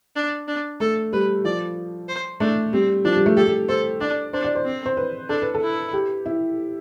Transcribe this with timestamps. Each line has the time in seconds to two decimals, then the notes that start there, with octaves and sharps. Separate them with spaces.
0.16 D4
0.48 D4
0.80 A3 A4
1.13 G3 B4
1.45 F3 D5
2.08 C5
2.40 A3 D4
2.73 G3 C4
3.05 F3 D4
3.16 G3
3.26 A3
3.37 G4 A4
3.47 G4
3.69 A4 C5
4.01 D4 D5
4.33 D4 C5
4.45 D5
4.55 C5
4.65 C4
4.86 C5
4.97 B4
5.29 D4 A4
5.42 B4
5.54 A4
5.62 E4
5.93 G4
6.26 E4